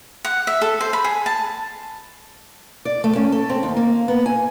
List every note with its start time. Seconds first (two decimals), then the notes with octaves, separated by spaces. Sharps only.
0.25 F#5
0.47 E5
0.61 A4
0.81 C5
0.93 B5
1.04 G#4
1.26 A5
2.85 D5
3.04 A3
3.16 C#4
3.32 A4
3.49 C4
3.63 D#2
3.77 A#3
4.08 B3
4.26 G#5